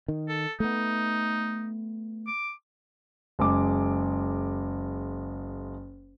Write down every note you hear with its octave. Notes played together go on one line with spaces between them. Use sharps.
D#3
A4
A3 B3 D#4
D6
F#1 G#3 D6